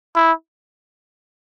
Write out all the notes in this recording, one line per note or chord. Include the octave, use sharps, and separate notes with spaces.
E4